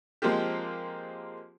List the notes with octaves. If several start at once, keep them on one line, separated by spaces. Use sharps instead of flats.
F3 G#3 A#3 C4 F4 G4